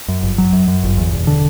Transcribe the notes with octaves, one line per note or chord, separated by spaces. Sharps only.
F#2
G1
F#3
F#2
F#2
G1
E2
E1
D3